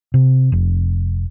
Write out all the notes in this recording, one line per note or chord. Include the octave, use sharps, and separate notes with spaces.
C3
F1